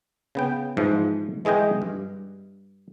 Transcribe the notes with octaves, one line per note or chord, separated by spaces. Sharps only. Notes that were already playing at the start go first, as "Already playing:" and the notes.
C#3 B3 G5
G#2 E3 F3
E3 G#3 G#4 D#5 G5
G2